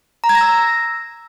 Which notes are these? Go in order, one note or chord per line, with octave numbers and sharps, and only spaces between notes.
A#5
G#6
A#6
E6